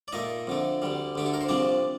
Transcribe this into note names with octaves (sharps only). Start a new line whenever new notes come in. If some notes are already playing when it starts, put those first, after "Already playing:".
D5
A#2 A3 D#4 D#5
F2 D3 A3
D2 D3 G3
D2 D3 A3 G4
A4
A#4
C5
C2 C3 F3 D4 D5